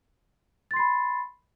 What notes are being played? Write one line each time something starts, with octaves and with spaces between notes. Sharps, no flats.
B5 C6 A6 C7